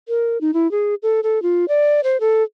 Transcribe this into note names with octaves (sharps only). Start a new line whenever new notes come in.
A#4
D#4
E4
G#4
A4
A4
F4
D5
C5
A4